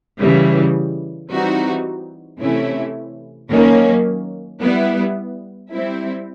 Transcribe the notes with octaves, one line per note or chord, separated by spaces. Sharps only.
C#3 E3 G3
E3 G3 C4 D#4 F#4
C3 E3 A3 C#4 E4
D#3 F#3 A#3 C#4
G3 B3 E4
G3 C4 E4